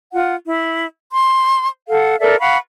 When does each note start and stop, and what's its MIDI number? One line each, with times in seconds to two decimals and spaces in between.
0.12 0.34 65
0.12 0.34 78
0.46 0.86 64
1.12 1.68 84
1.88 2.15 69
1.88 2.15 77
1.88 2.15 78
2.20 2.39 69
2.20 2.39 70
2.20 2.39 74
2.20 2.39 76
2.39 2.57 77
2.39 2.57 78
2.39 2.57 83
2.39 2.57 85